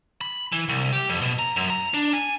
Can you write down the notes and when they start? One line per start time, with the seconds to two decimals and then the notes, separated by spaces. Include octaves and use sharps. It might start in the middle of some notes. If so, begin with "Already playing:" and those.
0.21 B5
0.52 E3
0.69 C2
0.93 G4
1.09 F2
1.21 B2
1.39 A#5
1.56 F#2
1.70 A#5
1.94 D4
2.13 G#5